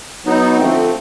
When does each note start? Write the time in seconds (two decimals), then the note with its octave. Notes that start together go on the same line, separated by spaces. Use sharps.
0.25 F#3 B3 D#4
0.58 D3 F3 A3 C4